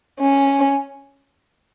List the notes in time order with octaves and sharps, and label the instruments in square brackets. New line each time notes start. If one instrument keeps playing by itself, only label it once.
[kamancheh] C#4